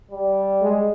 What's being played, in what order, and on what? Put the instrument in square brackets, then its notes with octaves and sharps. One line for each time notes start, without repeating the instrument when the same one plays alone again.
[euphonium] G3
[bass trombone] G#3